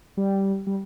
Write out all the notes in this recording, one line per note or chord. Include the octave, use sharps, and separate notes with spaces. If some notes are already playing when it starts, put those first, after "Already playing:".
G3
G3